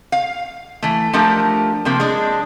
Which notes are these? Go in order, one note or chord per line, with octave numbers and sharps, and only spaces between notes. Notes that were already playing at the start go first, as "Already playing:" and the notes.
F5
E3 A3
F3 A3 D4 G4 A#4
C3 F3 A#3
G#3 D4